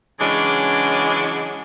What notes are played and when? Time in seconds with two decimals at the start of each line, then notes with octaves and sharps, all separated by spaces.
0.20 C#3 E3 F#3 G#3 C#4 D4